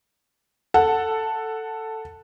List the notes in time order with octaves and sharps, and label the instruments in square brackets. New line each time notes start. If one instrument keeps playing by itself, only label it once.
[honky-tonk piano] A4 [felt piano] F#5